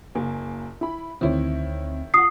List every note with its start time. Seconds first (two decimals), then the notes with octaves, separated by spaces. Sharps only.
0.15 F#1 A#3 G#5
0.81 E4 B5
1.21 D2 D#3 C4 E4 C#5
2.14 F4 F#5 D#6 C7